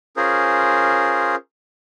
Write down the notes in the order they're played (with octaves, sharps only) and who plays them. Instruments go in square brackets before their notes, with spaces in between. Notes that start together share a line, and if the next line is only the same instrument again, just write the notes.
[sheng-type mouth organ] C#4 F4 G#4 A#4 C5